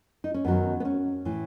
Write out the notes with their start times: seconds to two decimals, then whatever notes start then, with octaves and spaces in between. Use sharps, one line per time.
0.24 D#4
0.34 C#4
0.44 F#2 D#3 F#3 B3
0.80 B3
0.85 C#4
1.25 A2 E3